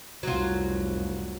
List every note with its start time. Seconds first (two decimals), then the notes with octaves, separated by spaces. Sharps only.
0.23 F1 C2 F#3 F4